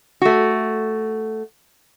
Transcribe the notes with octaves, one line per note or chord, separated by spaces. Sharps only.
A3 F#4